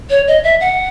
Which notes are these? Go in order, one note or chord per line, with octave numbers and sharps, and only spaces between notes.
C#5
D#5
E5
F#5